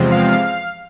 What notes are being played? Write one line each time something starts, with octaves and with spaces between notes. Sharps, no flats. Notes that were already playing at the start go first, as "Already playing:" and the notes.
Already playing: E2 C3 F3 G#3 C4
F5